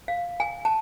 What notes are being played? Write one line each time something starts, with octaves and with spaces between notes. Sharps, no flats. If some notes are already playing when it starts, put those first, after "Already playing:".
F5
G#5
A5